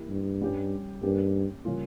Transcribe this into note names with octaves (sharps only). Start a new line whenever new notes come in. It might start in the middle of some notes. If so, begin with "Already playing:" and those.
Already playing: E3 A#3 E4 G4
G2
G3 C#4 G4
G2 A#3 C#4 G4 A#4
C#3 G3 A#3 C#4 F4